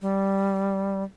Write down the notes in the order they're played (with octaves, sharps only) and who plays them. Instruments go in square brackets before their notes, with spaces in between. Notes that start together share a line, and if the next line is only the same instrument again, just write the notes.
[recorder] G3